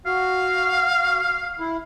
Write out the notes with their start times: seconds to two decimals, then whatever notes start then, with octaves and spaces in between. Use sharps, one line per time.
0.06 F#4 F5
1.60 E4